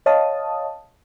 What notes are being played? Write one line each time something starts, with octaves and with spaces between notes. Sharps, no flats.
C#5 D#5 F5 A5 D#6